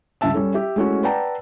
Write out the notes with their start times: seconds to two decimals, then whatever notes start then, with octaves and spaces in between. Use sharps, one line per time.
0.21 C#2 G2 E5 A5 E6
0.34 G3 C#4 A4
0.54 G4 E5
0.76 G#3 A3 C#4 E4 F#4
1.04 B4 D5 F#5 G5 A5 A#5